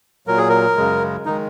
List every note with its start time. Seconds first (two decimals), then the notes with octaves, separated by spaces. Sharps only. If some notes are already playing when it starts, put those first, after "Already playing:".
0.27 A#2 F#3 A#4
0.38 G#4
0.49 A#4
0.77 F#2 C#3 G#3
1.26 D#3 G#3 D#4